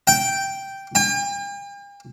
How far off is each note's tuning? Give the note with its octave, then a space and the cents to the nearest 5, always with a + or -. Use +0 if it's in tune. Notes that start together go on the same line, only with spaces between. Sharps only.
G5 -5
G5 +45